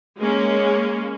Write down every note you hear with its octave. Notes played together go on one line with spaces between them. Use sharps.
G#3 A#3 C#4